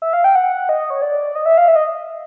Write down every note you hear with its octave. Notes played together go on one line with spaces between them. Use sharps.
E5
F5
G5
F#5
D#5
C#5
D5
D#5
E5
F5
E5
D#5